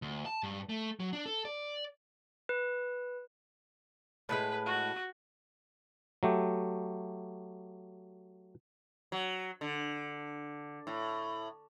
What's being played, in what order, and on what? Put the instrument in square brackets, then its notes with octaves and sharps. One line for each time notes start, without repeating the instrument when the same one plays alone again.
[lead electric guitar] D2
A5
G2
A3
F#3
D4
A4
D5
[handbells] B4
[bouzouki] A2 E3 G#3 [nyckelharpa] B4
[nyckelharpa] F#4
[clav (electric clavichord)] F#3 A3 G4
[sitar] F#3
D3
A2